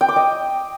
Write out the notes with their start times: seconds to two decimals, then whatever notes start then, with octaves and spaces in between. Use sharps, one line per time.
0.01 G5
0.08 D6
0.16 D#5